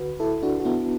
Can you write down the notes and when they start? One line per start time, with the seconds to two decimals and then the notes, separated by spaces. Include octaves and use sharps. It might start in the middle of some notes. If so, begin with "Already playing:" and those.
Already playing: D2 D3 F#4 B4
0.20 E4 A4
0.43 D4 F#4
0.60 F#4
0.65 B3 E4